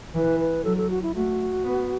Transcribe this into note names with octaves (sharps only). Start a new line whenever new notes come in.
E3 B4
B4
F#3 A4
A4
F#4
E4
A3 F#4
B3